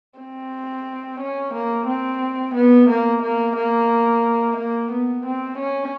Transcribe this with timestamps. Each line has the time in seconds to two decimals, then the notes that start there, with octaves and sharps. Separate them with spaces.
0.19 C4
1.20 C#4
1.54 A#3
1.87 C4
2.55 B3
2.89 A#3
3.22 A#3
3.56 A#3
4.57 A#3
4.91 B3
5.26 C4
5.58 C#4